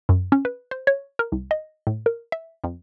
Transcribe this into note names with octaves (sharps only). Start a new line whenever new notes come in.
F#2
C#4
B4
C5
C#5
A#4
C2
D#5
A2
A#4
E5
F2